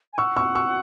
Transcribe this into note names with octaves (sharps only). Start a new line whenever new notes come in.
G#5
F#5 C#6 E6
C#6 E6
C#6 E6